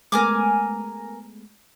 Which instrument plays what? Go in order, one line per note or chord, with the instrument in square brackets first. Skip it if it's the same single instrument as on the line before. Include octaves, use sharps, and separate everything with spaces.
[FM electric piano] G#3 A3 B3 [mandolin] A#4 G#5 D6